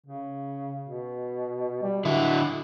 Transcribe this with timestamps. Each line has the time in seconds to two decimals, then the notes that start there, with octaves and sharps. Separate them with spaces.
0.07 C#3
0.88 B2
1.83 G3
2.05 D3 E4 F#4